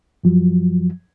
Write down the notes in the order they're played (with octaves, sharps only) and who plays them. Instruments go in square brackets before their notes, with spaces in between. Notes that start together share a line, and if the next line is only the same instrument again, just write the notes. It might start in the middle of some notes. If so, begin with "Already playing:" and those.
[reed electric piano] F#2 F3 F#3